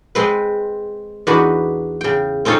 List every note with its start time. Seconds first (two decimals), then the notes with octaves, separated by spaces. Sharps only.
0.15 G#3 C4 B4
1.27 E2 D4 D#4 F#4 B4 B5
2.01 C#3 G5
2.45 C4 C#4 D#4 F4 A4 C#5